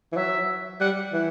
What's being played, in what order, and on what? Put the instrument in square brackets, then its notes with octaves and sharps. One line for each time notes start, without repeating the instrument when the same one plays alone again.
[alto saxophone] E3
[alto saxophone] F#3 [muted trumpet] E5
[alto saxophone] G3 [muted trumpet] F#5
[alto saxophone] E3